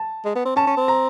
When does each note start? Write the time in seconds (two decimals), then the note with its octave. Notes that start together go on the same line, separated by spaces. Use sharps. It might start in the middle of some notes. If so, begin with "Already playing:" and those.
Already playing: A5
0.25 G#3
0.36 B3
0.45 C4
0.56 C#4 A5
0.67 C#4
0.77 C4
0.88 A#5